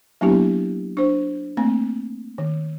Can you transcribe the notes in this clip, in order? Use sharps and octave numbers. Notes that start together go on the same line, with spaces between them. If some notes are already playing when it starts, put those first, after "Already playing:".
F#3 A#3 B3 D4 E4 G4
D4 C5
A3 A#3 C4
D#3